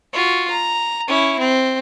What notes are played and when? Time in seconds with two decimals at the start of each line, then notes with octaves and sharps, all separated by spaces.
0.13 F4 F#4
0.50 A#5
1.08 C#4 E4
1.39 C4